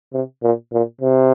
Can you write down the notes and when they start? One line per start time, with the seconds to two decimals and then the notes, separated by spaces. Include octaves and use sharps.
0.13 C3
0.43 A#2
0.72 A#2
1.01 C3